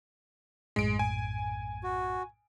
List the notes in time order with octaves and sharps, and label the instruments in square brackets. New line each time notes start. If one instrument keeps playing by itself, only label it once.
[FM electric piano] A#1 F#2 A2 [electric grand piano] G#3 D7
[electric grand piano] G#5
[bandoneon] F#4